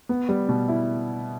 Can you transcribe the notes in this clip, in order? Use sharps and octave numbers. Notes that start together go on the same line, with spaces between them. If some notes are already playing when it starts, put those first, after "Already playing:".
B3
G3
B2
E4